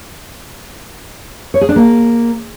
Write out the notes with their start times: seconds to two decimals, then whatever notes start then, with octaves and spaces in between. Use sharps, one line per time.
1.54 C#5
1.61 G#4
1.69 D4
1.76 A#3